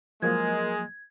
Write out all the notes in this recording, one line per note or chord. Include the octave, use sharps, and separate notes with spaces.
F3 F#3 G#3 A#3 A#4 G#6